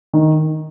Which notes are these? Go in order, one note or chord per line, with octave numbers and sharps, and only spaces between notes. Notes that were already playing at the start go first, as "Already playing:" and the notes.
D#3